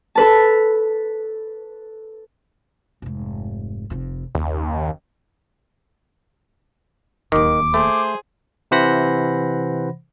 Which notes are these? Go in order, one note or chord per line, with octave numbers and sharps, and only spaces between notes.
A4 B4 A5
F1 G#2
F1 F2
F#1 D#2
D1 D#2 D#3 D6
A3 G#4 C5
C3 E3 C5 F#5 B5 A#6